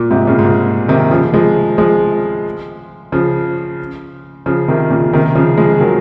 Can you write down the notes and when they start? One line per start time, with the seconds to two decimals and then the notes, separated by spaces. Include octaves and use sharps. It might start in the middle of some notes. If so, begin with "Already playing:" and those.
Already playing: A#2
0.11 G#2 C3
0.27 A#2 C#3
0.39 G#2
0.44 A#2
0.88 C3 D#3
1.11 C#3 F3
1.34 F3 G#3
1.78 F3 G#3
3.12 C#3 F3
4.46 C#3 F3
4.68 C3 D#3
4.90 A#2 C#3
5.13 C3 D#3
5.35 C#3 F3
5.57 F3 G#3
5.80 D#3 F#3